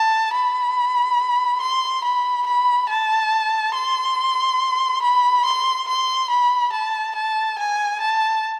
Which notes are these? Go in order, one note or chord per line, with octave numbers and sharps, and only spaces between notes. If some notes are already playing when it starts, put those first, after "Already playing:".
Already playing: A5
B5
C6
B5
B5
A5
C6
B5
C6
C6
B5
A5
A5
G#5
A5